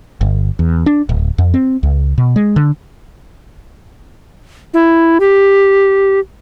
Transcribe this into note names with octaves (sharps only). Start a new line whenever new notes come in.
G1
E2
D4
D1
F2
C4
C#2
B2
G#3
D3
E4
G4